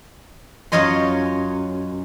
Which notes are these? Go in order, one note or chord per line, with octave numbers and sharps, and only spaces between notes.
F#2 F4 C#5 D#5 C6